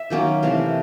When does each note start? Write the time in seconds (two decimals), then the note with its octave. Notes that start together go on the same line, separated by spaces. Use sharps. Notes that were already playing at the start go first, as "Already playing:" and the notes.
Already playing: E5
0.10 D#3 F#3 A#3 C#4
0.43 C3 E3 A3 F5